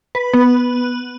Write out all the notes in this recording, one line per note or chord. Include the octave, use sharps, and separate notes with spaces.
B4
B3